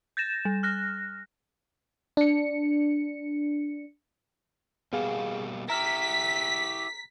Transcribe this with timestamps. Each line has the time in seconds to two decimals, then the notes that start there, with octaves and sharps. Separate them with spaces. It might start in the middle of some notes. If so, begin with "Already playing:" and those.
0.17 G6 A6 A#6 E7
0.45 G3
0.63 F6 F#6 A#6
2.17 D4 C#7
4.93 B2 G3 A#3 B3 G#4 F5
5.70 E4 G4 A#5 F6 B6